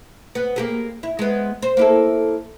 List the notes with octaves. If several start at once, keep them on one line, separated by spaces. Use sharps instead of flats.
B3
A#3 G4 G#4
E4
G#3 B3
C5
A#3 E4 A4